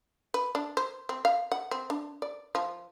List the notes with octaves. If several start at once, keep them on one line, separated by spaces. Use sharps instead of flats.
B4
D4
C5
C4
F5
F#5
C4
D4
D5
F3